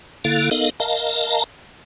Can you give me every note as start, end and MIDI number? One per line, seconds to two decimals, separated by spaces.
0.25 0.50 50
0.25 0.50 58
0.25 0.50 64
0.25 0.50 69
0.25 0.50 77
0.51 0.70 59
0.51 0.70 63
0.51 0.70 69
0.51 0.70 70
0.51 0.70 75
0.51 0.70 77
0.80 1.44 70
0.80 1.44 75
0.80 1.44 77
0.80 1.44 81
0.80 1.44 82